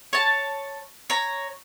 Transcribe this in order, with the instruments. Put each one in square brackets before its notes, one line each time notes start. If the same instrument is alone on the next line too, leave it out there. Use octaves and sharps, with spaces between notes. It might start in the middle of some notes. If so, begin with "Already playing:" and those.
[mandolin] C#5 A5
C#5 A#5